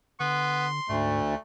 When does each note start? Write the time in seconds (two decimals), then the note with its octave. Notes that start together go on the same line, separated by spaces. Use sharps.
0.20 D3 B3 C6
0.89 D2 G#2 A3